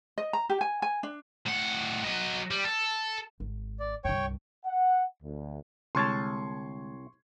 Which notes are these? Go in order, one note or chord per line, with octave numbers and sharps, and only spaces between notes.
D#5
A#5
G4
G#5
G#5
D4
A2 F#5
F#3 D#5
G3
A4
G#1
D5
C2 G2 C#5 G5 C#6
F#5
D2
C2 D3 G#3 C#5 A5 C6 C#6 G#6